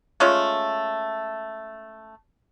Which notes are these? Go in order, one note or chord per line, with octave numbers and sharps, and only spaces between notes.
G#3 A3 C#4 F4